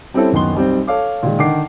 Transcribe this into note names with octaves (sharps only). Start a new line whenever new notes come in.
G3 C4 C#4 E4 A4
D1 F#2 D#3 B3 C6 G7
B1 G3 C4
A4 C#5 F5 D6
A#2 D#3 G#3
D3 D#3 F#5 D6 C7